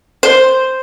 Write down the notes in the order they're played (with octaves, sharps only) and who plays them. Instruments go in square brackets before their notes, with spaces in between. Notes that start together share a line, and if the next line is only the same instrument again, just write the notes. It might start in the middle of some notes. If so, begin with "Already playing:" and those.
[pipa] C5